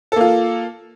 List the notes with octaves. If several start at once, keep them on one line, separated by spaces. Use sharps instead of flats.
A#3 F4 A4